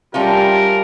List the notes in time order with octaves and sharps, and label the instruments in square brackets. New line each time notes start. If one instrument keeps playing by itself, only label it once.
[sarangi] G3 [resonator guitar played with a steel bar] A3 C#4 F4 [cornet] A#4